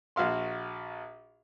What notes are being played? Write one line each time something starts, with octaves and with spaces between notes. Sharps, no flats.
A#1 F#4 F5 C6